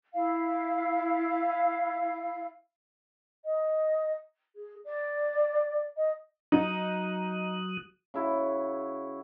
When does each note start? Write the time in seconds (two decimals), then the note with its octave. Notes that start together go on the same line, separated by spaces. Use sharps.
0.14 E4 F5
3.45 D#5
4.55 G#4
4.84 D5
5.96 D#5
6.52 F#3 D#4 D#6 F#6
8.14 C#3 E4 F#4